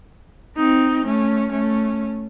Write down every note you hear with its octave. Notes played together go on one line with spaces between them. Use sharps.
C4 D#4
A3 C#4
A3 C#4